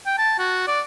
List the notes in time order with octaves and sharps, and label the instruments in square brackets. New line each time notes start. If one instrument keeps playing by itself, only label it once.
[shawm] G5
A5
F#4
D5